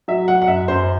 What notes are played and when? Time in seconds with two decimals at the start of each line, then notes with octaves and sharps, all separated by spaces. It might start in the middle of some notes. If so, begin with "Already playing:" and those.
0.08 F#3 E5
0.28 F#3 F#5
0.42 F#5
0.48 F#2 E5
0.68 F#2 C5